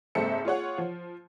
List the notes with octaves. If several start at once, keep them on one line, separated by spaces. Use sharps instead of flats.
F#1 G#2 C4 A4 E5 C#7
F4 G#4 C#5 F#5
F3